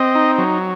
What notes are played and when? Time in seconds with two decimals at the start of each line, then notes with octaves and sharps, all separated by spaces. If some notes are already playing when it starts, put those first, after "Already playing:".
Already playing: C4 D#5
0.15 D#4
0.38 F#3